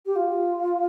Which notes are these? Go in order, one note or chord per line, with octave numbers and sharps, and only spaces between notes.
G4
F4